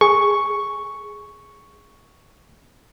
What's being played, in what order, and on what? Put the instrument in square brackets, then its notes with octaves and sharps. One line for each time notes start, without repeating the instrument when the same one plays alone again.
[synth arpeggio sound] G#4 [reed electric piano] C#6